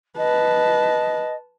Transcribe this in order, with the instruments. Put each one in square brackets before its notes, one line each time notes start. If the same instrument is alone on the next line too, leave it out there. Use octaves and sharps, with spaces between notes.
[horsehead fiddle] B4 A5 [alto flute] D#5